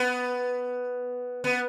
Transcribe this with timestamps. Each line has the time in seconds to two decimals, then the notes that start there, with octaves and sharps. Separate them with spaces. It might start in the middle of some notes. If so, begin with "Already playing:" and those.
Already playing: B3
1.44 B3